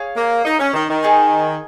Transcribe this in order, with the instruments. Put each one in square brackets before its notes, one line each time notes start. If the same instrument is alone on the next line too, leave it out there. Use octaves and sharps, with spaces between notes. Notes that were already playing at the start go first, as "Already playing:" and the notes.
Already playing: [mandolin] G#4 C#5 F5
[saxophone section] A#3
D#4
C#4
D#3
D#3
[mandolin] D#4 G#4 D#5 G#5